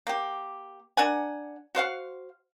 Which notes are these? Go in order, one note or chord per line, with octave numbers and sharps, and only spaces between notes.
A#3 G4
D4 A#4 F#5 G#5
F#4 C5 F5 F#5